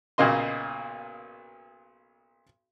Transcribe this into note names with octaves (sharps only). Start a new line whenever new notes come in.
B1 A#2 C#3 A#3 D#5 C6